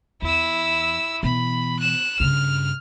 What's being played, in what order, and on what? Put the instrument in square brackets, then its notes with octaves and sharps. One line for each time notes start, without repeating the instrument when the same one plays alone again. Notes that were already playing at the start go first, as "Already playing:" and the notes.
[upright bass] E2 [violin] E4 E6
[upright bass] B2 E3 [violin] B5
[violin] F#6 E7
[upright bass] G2 C#3 [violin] F6